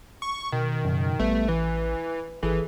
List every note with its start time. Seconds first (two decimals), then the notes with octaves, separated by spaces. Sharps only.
0.22 C#6
0.52 B2 D#3
0.85 F#2 C#3
1.19 A1 G3 A3 B3 B4
1.48 E3 B4
2.43 G#1 E3 G#4 A4